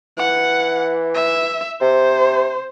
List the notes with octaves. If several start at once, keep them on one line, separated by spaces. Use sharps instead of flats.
E3 F#5
E5
C3 C5